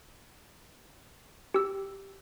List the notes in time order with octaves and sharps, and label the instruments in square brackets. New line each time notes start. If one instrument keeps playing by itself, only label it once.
[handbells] G4 E6